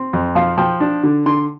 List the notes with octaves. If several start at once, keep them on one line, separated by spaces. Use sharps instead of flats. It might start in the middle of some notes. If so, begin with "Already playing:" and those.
Already playing: C4
F2
F3 F5
F3 G5
D4
D3
D3 C6